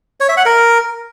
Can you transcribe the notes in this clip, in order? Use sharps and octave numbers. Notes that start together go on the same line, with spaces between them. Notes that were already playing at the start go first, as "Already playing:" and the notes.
C#5
E5
F#5
A#4